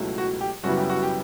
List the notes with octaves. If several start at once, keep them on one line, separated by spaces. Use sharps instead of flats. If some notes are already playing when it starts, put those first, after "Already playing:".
Already playing: C#2 B2 F#3 A3 E4
F#4
G4
F#2 C#3 G3 B3 E4 F#4
G4
F#4
G4